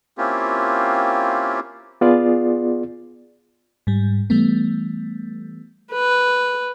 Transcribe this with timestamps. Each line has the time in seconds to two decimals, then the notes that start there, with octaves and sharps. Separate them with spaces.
0.18 A#3 C4 C#4 E4 F4 G4
2.01 B3 F4 G#4 D5
3.87 G#2 G3
4.30 E3 G3 A3 B3
5.92 B4